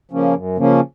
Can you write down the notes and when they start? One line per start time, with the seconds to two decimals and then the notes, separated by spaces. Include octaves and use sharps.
0.11 C#3 F3 A#3 C#4
0.34 F#2
0.57 C#3 F3 A#3 C#4